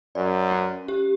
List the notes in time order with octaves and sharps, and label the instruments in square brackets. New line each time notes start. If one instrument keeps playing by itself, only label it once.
[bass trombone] F#2 [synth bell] D5
[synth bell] C#4
G4